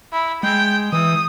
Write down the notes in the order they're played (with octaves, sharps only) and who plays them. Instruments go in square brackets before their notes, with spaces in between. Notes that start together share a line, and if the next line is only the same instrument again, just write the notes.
[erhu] E4
[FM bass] G#3 [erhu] G5
[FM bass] E3 [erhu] D#6